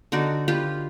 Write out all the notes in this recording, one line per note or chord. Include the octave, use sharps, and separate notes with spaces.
D3 D#4 F#4 D5
F4 G4 B4